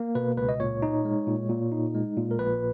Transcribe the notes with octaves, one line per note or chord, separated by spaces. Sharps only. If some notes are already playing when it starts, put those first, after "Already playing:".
Already playing: A#3
B2 B4
C#2 B4
D#5
A#2 C#5
D#4
G#3
A#2
A#2
D#4
G#3
A#2
A#4
A#1 B4